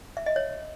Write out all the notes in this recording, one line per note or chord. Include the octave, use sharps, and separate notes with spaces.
E5
D#5
C#5